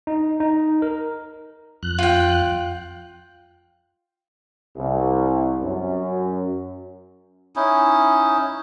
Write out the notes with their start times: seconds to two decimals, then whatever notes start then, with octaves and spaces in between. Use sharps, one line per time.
0.07 D#4
0.40 D#4
0.82 A#4
1.83 F2 F#6
1.98 F4 G5
4.76 C2
5.62 F#2
7.56 C#4 D#4 E4